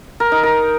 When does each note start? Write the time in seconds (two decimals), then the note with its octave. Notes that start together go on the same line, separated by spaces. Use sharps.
0.20 A#4
0.32 D#4
0.43 A#4